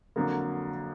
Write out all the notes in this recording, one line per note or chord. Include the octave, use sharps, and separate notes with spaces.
F2 D3 F#3 A#3